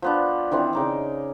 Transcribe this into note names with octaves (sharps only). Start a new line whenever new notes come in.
F3 B3 D4
D#3 E3 C4 D4
C#3 D#4 D6